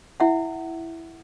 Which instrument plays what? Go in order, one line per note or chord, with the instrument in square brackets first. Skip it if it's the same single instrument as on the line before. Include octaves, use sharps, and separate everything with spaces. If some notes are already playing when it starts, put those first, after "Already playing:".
[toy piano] E4 E5 F#5